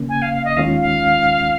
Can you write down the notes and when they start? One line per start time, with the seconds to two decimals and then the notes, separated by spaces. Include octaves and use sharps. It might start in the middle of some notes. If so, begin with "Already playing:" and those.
Already playing: C#3 A#3 C#4
0.09 G#5
0.22 F5
0.33 F5
0.45 D#5
0.57 D#2 D#3 G#3 C#4 F4 F5
0.81 F5